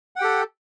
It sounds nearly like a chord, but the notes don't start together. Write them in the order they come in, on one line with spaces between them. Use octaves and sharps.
F#5 G5 G4 A4